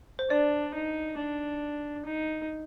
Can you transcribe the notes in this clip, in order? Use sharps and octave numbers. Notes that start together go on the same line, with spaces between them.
C5
D4 D5
D#4
D4
D#4